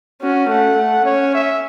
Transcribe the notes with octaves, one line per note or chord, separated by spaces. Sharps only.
C#4 F#4
A3 F#5
A3
C#4 C#5
E5